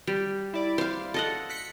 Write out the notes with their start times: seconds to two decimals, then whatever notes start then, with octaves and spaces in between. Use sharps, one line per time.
0.07 G3
0.54 E4 D5
0.78 C5 F5
1.14 A4 D#5 F#5
1.50 F#6 B6 C#7